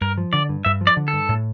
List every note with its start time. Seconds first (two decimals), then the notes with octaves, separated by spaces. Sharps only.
0.01 G2 A#4
0.17 F3
0.33 D3 D5
0.49 G2
0.65 G2 E5
0.81 F3
0.87 D5
0.97 D3
1.08 A4
1.13 G2
1.29 A2